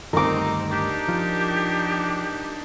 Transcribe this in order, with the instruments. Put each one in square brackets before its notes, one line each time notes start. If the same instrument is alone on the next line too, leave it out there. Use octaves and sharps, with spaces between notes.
[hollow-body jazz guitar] D2 G2 D#3 [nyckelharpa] C4 D#4 [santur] A#4 D6
[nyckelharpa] D4 D#4 [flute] G4
[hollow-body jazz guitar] F3